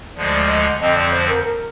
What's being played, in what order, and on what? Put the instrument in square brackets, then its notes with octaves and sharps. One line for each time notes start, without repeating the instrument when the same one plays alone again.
[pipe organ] D2 D3 F3 G#3 [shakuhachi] D5
[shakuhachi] D#5
[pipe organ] F2 D3 F3 C4 [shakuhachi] D#5
[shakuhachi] D5
C5
A#4
A#4